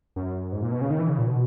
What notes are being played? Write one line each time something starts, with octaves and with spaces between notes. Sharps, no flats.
F#2
G#2
A#2
B2
C#3
D#3
E3
C#3
A#2
B2